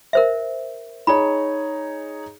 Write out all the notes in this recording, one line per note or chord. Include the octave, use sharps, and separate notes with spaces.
A#4 C5 E5
D#4 G#4 C#5 B5